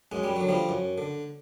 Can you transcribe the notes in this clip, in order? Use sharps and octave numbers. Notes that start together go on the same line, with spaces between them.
F#2 G#3
G3
D3 F#3
F3 G3
F#2
D3